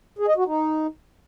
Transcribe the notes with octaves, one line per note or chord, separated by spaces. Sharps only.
G#4
D#5
F#4
D#4